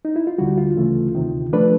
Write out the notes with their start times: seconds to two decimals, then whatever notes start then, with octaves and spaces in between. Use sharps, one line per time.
0.05 D#4
0.16 E4
0.27 F4
0.38 D2 D3 G3 F#4
0.58 F4
0.76 D2 C#3 E3 A3
1.15 D2 C3 D#3
1.53 F3 A3 D4 B4